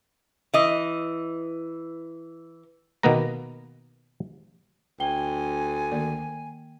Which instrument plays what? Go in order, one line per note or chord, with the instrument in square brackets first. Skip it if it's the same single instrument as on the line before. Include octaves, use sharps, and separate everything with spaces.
[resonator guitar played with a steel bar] E3 D#5
[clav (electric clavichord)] B2 D#3 A#3 B3 B4 A#5
[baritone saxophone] D2 [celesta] G5 G7 [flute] G#5
[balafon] D#3 A#3 D5